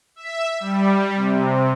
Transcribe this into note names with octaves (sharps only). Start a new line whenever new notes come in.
E5
G3
C3